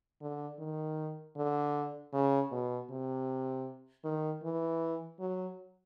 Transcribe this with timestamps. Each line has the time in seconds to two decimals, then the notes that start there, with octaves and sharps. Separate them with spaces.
0.21 D3
0.59 D#3
1.37 D3
2.13 C#3
2.52 B2
2.90 C3
4.04 D#3
4.43 E3
5.20 F#3